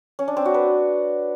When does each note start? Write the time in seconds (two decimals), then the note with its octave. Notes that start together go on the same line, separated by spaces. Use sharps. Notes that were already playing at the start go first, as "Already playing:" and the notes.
0.19 C#4
0.28 D4
0.37 C4
0.45 F#4
0.54 B4